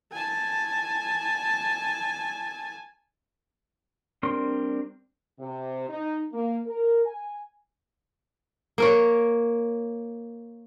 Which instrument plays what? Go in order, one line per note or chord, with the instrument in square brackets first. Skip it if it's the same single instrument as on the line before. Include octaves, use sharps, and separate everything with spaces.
[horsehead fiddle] G#5 A5
[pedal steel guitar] G3 C4 D4 A#4 C6
[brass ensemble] C3
D#4
A#3
A#4
G#5
[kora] A#3 A#4 C#5